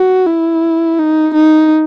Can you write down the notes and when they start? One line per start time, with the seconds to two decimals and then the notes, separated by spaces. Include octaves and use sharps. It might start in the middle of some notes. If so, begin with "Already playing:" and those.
Already playing: F#4
0.26 E4
0.99 D#4
1.34 D#4